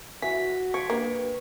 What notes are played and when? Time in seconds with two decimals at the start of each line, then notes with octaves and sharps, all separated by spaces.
0.22 E3 F#4 B6
0.74 F3 C#6 G#6 B6 D7
0.90 A#3 D4 G4 B4